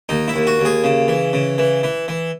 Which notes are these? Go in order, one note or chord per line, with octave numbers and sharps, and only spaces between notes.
D#2 D#4
E4
D#2
F#4
D#2
G#4
C#3
E3
C#3
E3
E3
E3